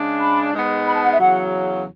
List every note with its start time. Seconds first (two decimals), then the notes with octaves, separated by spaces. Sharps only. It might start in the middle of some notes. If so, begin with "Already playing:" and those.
Already playing: C#3 G#3 D4
0.19 B5
0.52 G#2 G#3 B3
0.86 B5
0.95 A5
1.03 F#5
1.12 E5
1.20 E2 C#3 F#3 F#5